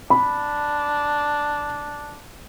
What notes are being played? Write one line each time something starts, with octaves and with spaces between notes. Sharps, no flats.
D4 B5